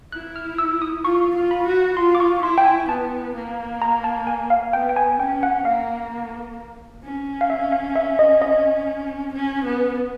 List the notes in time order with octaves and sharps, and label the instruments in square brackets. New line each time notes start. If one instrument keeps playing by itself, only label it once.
[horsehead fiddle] E4 [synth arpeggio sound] F#6
[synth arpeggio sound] F6
E6
D#6
[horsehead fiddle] F4 [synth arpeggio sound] C#6
[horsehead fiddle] F4
[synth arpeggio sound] B5
[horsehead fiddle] F#4
[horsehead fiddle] F4 [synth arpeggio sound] C6
[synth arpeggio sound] D6
C#6
[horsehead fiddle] E4 [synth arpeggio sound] C6
[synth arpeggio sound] G5
G#5
[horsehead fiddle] B3 [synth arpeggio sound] A5
[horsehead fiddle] A#3
[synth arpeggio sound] A#5
A5
G#5
F5
[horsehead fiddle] B3 [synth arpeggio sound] G5
[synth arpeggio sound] G5
G#5
[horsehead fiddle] C#4 [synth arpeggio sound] G5
[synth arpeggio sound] F#5
[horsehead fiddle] A#3 [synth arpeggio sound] F5
[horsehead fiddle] C#4
[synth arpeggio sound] F5
E5
F5
E5
D#5
D#5
[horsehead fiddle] C#4
B3